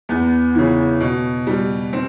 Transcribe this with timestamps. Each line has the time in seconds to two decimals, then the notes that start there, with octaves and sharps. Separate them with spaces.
0.09 E2 B3
0.55 C#3 E3
1.00 B2
1.47 G3
1.93 C4